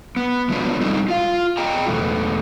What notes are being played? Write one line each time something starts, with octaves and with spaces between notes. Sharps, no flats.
B3
F3 F#3 G#3 B3 D4
G3 C4 D#4 E4
F4 F5
G#4 D#5 G5 A#5
E2 B2 A3 A#3 F4